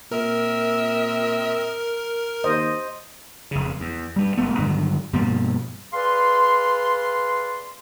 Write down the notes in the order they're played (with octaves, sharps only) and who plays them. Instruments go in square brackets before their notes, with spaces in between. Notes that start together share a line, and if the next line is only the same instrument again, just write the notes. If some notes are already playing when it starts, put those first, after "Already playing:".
[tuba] A#2 [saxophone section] C4 D#5 E5 [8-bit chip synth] A#4
[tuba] D#2 [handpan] C5 D#5
[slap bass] F1 C#3
E2
G2 G3
D#1 E2 A3 B3
G2 D3 D#3 F#3
G2 B2 F3 A#3
[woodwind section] G#4 B4 D5 F5 C6